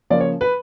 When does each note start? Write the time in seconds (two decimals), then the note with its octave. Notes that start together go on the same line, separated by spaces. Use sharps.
0.10 C#3 F3 A#3 C#4 D5
0.20 C#5
0.41 B4